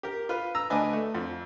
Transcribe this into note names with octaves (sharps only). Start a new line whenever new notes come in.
G4 A#4
F4 B4 F6
A#5 E6
D2 D4 B4 D#5 G#5 D6
A3
F2